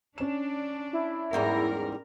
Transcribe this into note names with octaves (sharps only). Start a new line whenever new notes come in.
C#4 D4 E7
E4
E2 G#2 G3 A#4